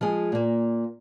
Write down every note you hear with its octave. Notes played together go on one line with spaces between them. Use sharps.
F3 G#3 G#4
A#2 A#3